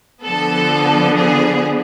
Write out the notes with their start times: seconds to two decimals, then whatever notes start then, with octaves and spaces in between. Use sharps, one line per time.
0.24 D3 F3 B3 A4
1.15 G#4